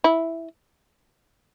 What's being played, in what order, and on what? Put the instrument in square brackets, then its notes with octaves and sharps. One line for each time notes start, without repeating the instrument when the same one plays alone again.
[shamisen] E4